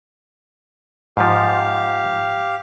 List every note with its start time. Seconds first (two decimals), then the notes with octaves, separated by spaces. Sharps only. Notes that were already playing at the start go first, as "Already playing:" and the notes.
1.17 G#2 F3 G4 F5